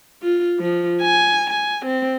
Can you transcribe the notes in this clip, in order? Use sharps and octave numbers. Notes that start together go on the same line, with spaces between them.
F4
F3
G#5
G#5
C4